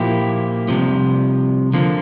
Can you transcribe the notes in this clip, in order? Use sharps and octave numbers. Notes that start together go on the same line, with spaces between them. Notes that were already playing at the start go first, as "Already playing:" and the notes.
Already playing: A#2 F3 A#3 E4 G4
C2 C3 F3
D3 F3 A#3